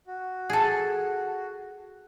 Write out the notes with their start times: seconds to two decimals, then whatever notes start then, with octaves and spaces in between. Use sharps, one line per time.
0.07 F#4
0.50 G#4 A4